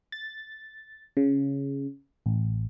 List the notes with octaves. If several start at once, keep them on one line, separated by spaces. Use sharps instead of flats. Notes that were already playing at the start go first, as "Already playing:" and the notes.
A6
C#3
A1